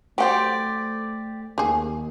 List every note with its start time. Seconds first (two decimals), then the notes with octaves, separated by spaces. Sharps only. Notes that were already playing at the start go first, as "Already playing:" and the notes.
0.18 F#3 A3 G4 C5 D5 F#5
1.58 D#2 G4 G#4